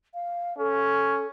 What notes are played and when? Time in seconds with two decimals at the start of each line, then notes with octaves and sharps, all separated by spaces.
0.14 F5
0.58 C#4 A4